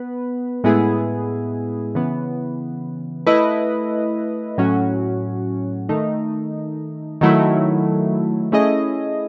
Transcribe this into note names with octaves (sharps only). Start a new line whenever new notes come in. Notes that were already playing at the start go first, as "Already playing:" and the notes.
Already playing: B3 B4
A2 G#3 B3 E4 G#4
C#3 E3 B3
A3 E4 B4 D#5
A2 F#3 C#4 F#4
D#3 A3 D#4
D#3 F#3 A3 E4
A3 C#4 E4 G#4 D#5